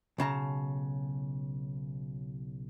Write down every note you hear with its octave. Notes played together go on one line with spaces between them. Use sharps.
B1 C#3 A5 A#5